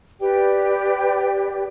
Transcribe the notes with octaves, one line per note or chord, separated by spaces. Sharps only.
G4 B4 D5 G5